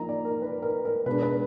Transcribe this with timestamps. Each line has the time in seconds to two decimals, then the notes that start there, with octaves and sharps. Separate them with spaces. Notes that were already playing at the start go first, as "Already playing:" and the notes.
Already playing: F3 A#3 D#4 A#5
0.09 D5
0.25 A#4
0.42 B4
0.62 A#4
0.85 A#4
1.06 B2 G#3 D4 B4
1.22 B4